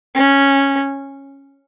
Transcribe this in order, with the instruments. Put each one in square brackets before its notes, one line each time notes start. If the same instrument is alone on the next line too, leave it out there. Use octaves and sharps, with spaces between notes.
[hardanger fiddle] C#4